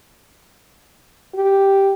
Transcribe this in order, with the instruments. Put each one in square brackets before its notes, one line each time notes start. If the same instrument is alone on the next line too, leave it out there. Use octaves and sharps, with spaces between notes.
[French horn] G4